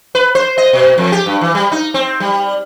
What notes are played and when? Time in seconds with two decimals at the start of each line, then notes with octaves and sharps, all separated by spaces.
0.15 B4
0.35 C5
0.58 D#5
0.73 B2
0.98 F2
1.12 G4
1.26 G2
1.41 E3
1.55 G3
1.72 D#4
1.94 C4
2.20 G3